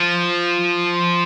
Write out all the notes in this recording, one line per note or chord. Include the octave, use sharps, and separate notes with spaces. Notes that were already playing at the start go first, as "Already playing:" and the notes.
Already playing: F3